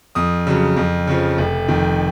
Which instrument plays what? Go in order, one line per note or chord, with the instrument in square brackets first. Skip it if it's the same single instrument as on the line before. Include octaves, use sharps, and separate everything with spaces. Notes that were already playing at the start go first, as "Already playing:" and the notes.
[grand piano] F2 D#6
C#3 F#3
F2
C#3 F3
F1
F2 D#3